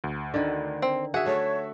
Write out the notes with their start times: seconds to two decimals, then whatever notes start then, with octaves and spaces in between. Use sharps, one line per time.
0.04 D2
0.34 D3 D#3
0.82 C4
1.14 F#4 G#4 E5 F#5
1.26 A3 C#5